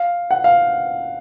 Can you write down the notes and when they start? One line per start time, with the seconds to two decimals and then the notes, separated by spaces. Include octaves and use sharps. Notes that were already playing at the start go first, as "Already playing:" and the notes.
Already playing: F5
0.31 F#5
0.44 F5